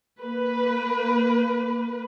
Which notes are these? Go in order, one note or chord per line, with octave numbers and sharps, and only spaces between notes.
A#3 B4